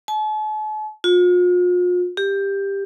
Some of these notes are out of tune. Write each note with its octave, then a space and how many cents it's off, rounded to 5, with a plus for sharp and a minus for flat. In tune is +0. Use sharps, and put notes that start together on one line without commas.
A5 -45
F4 +40
G4 +15